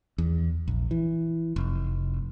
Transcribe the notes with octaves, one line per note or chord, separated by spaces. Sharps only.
E2
A#1
E3
F1